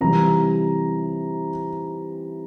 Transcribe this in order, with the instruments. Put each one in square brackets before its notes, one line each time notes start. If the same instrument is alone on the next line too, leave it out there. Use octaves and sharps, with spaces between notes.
[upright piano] C3 E3 G3 A#5